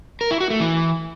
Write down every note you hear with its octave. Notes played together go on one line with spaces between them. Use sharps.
A#4
E4
F#4
A3
E3